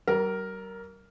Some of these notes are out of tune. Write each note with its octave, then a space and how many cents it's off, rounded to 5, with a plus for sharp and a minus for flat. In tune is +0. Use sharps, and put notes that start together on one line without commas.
G3 -45 A#4 +0